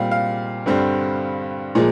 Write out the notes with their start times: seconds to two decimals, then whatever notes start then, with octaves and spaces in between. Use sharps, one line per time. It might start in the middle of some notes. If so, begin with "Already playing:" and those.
Already playing: A#2 G3 C4 F5
0.11 F5
0.66 G2 D3 G3 C4
1.75 A#2 F3 G#3